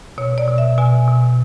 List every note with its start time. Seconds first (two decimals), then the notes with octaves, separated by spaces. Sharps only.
0.18 B2 C#5
0.38 D5
0.48 B2
0.58 E5
0.78 B2 G#5
1.08 B2